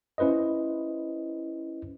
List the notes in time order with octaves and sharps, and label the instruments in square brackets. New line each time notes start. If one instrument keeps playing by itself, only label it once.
[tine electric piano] C#4 E4 B4 C5 D#5